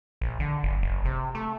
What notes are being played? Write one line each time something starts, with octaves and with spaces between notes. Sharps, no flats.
A#1
D3
F#1
F#1
C3
A3